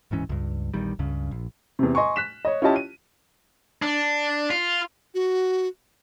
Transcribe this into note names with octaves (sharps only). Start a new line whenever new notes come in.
D1 G#2 E3 C#4
C#2 G2
A#1 E2 D#3 G3
C#2 G2 C#3
A#1
E2 C3
D#5 G#5 C6 C#6
F#6 B6 E7
C#5 D#5
C#4 E4 F4 G4 D#5 A5
D#7
D4
F4
F#4